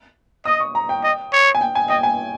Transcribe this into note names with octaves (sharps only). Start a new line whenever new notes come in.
D#5 D#6
C#6
A#5
G5
D#5
C#5
G#5
G5
G#5
D#5 G5
G#5